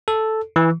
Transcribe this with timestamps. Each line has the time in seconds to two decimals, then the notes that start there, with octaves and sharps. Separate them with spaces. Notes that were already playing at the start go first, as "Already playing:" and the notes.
0.08 A4
0.56 E3